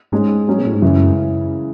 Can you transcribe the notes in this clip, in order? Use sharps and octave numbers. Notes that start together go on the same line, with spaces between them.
G#2 G#3 C#4 G#4
F#3 C#4 G#4
B2
A2
G#2
F#2 C#3 E3 G#3